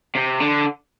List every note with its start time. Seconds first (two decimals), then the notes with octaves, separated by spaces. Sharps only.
0.15 C3
0.40 D3